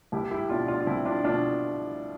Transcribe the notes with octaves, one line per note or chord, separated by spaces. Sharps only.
C2 E4 G4
E4 G4
B2 D4 F4
D4 F4
F4
C2 C4 E4
D4 F4
B2 D4 F4